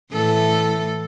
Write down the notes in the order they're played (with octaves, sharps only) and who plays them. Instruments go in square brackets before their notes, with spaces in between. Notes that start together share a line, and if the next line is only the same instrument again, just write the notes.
[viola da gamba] A2 E3 A4